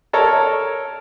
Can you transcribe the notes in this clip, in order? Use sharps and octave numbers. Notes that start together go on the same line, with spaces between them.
A4 A#4 C#5 A#5